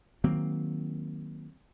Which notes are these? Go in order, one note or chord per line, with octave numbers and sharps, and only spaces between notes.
D#3 F#3 A#3 C4